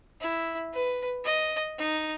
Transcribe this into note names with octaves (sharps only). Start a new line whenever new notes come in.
E4
B4
D#5
D#4